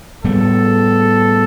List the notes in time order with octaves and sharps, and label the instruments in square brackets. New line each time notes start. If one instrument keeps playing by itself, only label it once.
[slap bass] A2 G3 B3 [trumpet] A4